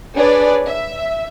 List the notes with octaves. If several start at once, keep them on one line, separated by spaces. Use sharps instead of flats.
D4 G#4 B4 C#5 D5
E5